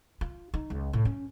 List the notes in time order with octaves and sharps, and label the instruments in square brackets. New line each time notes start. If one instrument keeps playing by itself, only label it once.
[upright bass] F4
D#4
C#2
A2
C#4